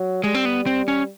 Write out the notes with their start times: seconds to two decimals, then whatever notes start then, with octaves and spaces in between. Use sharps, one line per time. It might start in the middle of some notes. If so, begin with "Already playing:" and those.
Already playing: F#3
0.24 G3 G#3
0.34 C4
0.45 B3
0.66 C4
0.88 C#4